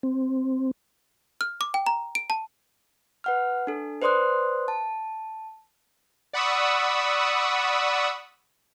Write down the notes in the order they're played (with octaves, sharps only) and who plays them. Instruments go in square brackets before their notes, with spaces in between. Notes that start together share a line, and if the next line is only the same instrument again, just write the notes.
[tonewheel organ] C4
[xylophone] F6
D6
G5
A#5
D7
A5
[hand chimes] B4 F#5 F6
D4 A4
B4 C5 D5 C6 D#6 F#6
A5
[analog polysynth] D5 F#5 B5 C#6 D#6 E6